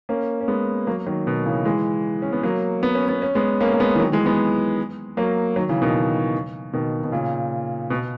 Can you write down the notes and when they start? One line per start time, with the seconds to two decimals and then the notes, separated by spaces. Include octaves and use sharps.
0.09 A#3 C#4
0.41 C#4
0.48 G#3 B3
0.87 F#3 A#3
1.06 D#3 F#3
1.27 B2 D#3
1.46 C#3 E3
1.65 E3 G#3
2.22 C#4
2.32 B3
2.43 F#3 A#3
2.83 B3
2.95 C#4
3.09 B3
3.22 C#4
3.35 G#3 B3
3.61 A#3 C#4
3.73 A#3
3.80 G#3 B3
3.95 E3
3.99 D#3 F#3
4.12 E3 G#3
4.26 G#3 B3
5.17 F#3 A#3
5.56 D#3 F#3
5.69 C#3 E3
5.82 B2 D#3
6.73 B2 D#3
7.04 B2
7.12 A#2 C#3
7.90 B2